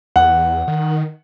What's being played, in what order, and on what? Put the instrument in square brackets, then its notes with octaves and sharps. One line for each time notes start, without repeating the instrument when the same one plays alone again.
[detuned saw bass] E2 [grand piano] F#5
[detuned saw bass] D#3